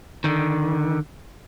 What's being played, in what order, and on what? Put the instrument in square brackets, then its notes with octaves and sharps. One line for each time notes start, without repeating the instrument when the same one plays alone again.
[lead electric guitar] D3 D#3